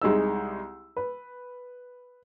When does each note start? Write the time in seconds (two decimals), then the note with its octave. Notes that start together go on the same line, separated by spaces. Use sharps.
0.02 C2 G#3 D#4 E6
0.97 B4